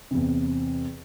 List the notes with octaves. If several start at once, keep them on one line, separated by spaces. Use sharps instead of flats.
E2 C3